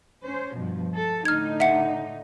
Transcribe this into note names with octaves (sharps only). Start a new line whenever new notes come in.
C#4 C5
G2 B2 F3
A4
A2 D3 D#4 F6 G#6
E5 F#5 C#7